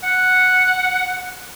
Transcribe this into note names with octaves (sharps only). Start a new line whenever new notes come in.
F#5